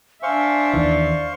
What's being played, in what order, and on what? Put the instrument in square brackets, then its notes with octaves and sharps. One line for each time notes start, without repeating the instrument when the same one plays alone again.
[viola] D4 E5 [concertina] C5 F5 C#6 [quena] G#5
[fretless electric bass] D#2 D#3 E3 [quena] D5